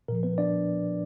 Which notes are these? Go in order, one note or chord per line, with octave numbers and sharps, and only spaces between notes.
A#2 F3 A#4
B3 B4
D4 D5